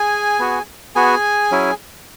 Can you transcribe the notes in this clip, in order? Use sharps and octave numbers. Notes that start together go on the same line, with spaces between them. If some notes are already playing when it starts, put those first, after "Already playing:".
Already playing: G#4 G#5
B3 F#4
B3 F#4 G#4 G#5
F#3 C#4 E4